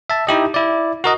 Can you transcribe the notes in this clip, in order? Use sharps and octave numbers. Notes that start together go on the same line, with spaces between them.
E5 A5
D#4 E4 G4 D#5
E4 D5
F#4 A#4 D#5